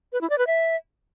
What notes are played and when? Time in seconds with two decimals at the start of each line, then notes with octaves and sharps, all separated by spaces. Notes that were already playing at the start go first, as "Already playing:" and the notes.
0.13 B4
0.21 E4
0.30 D5
0.38 B4
0.47 E5